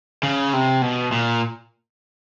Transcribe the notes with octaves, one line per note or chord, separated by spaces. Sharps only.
C#3
C3
B2
A#2